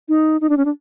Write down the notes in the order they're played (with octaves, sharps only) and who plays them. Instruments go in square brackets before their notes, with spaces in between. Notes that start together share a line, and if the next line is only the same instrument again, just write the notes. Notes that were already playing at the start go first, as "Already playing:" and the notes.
[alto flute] D#4
D#4
D4
C#4
D4